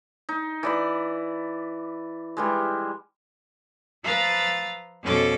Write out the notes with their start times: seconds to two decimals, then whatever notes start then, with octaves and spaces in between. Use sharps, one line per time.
0.29 D#4
0.63 E3 D5 B5
2.37 E3 G3 G#3
4.03 F3 B4 F5 A#5 E6 A6
5.03 F2 B2 F3 C#4 A4 D6